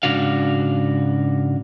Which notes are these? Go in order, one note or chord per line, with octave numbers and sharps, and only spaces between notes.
G#2 C#3 D4 F#4 F5